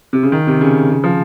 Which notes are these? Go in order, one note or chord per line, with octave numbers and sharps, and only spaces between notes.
C3
C#3
D#3
C3
C#3
C#3
F3